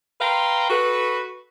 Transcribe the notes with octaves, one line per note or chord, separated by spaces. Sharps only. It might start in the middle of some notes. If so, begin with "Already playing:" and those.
B4 F5 G5 A#5 C6
F#4 A4 B4